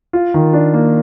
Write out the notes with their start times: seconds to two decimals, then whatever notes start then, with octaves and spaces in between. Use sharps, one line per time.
0.13 F4
0.34 D#3
0.53 D4
0.74 A#3